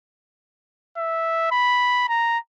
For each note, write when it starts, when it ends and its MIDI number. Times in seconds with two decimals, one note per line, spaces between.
0.97 1.51 76
1.52 2.07 83
2.09 2.38 82